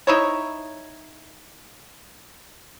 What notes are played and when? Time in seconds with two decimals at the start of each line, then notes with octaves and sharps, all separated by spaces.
0.07 D#4 E4 C#5